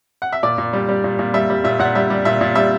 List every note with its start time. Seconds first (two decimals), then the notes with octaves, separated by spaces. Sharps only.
0.22 F#5
0.33 E5
0.43 A#2 D5
0.58 A#2
0.73 G3
0.89 G3
1.04 A#2
1.19 A#2
1.34 G3 E5
1.50 G3
1.64 A#2 E5
1.79 A#2 F#5
1.95 G3 E5
2.10 G3
2.25 A#2 E5
2.41 A#2
2.55 G3 E5